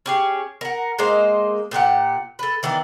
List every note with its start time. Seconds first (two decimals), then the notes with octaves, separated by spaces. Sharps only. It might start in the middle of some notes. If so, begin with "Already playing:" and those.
0.06 C#4 G4 G#4
0.61 A#4 F#5
0.99 G#3 A#3 D#4 C5
1.71 A#2 G4 G#4 F#5
2.39 A4 B4
2.63 D#3 E3 B3 D4